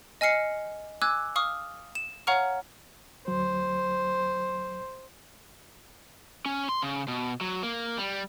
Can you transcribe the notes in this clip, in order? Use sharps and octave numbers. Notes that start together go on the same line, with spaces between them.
D#5 G#5 F6 C7 C#7
G#5 D6 E6 F#6 G#6
F5 C#6 D#6 F6
E7
C#5 F5 F#5 A#5 C#6 F6
D2 F#3 C5
C#4
C6
C#3
B2
F#3
A#3
G3